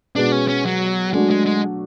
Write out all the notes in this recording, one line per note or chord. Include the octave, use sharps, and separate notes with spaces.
B2 G#3 B3 D4 F#4
C#4
C#4
F#3
F#3 G#3 A3 D4 F#4
G#3
G#3